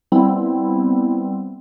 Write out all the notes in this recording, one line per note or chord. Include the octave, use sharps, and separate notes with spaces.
G3 B3 C4 E4